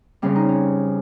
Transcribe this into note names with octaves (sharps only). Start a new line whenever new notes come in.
F2 C#3 G3 C#4
D#4
C#4